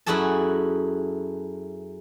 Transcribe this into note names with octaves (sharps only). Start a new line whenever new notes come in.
F#2 E4 F#4 G#4 A4 A5